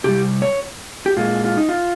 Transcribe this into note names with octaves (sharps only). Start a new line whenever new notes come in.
C3 G3 G4
C#5
G4
A#2 G#3 F4
F4
D#4
F4